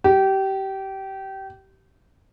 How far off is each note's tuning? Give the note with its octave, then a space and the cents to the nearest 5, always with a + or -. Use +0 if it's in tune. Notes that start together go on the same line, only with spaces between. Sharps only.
G4 -25